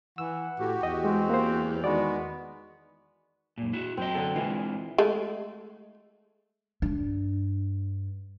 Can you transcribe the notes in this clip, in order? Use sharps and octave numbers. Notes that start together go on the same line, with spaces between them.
E3 F#5 E6
A2 F#4 G4
E2 D#5
G#3 C4
A#3 C5
D#3 G#3 B3 F#4 D5
F#2 A#2
E4 F#4
F#2 F#3 C4 D#5
D3 A4
E3 G#3 C4 F4
G#3 A3
G2 D4